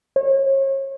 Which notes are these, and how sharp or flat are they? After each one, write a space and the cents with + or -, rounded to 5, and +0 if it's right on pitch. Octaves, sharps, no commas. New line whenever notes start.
C#5 -35